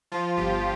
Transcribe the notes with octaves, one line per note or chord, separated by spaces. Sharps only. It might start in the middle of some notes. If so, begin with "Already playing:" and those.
F3 F4
G1 G4